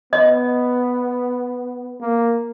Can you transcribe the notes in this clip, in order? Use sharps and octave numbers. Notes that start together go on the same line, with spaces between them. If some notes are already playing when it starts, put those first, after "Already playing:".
B3 D#5
A#3